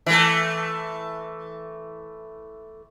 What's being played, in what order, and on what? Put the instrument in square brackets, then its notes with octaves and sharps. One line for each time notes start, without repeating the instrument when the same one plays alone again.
[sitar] E3 A3